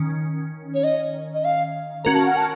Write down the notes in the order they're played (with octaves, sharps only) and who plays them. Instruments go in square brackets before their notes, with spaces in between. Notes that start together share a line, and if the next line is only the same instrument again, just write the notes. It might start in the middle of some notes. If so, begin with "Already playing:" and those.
Already playing: [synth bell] D#3 C#4
[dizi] C#5
D#5
D#5
F5
[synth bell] C#4 F#4 A#4 [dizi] A#5
[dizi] A5
F#5
A5